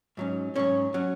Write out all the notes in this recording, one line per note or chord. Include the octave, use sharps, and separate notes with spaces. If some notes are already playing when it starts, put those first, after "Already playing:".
G#2 F#3 C#4
G#2 F#3 C#4 C#5
F#3 C#4